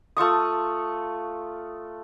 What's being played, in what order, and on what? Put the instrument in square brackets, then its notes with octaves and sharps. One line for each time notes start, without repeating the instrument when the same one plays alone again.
[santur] A3 F4 C#6 D#6